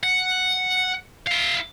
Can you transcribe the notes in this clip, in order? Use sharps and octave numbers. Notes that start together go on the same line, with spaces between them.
F#5
E4 F5